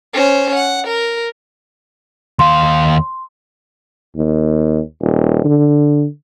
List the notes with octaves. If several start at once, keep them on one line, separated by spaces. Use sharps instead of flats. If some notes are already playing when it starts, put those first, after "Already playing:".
C#4 C5
F#5
A#4
D#2 F5 C6
D#2
D#1
D3